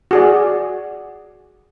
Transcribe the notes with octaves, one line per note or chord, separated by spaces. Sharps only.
F#4 G#4 D5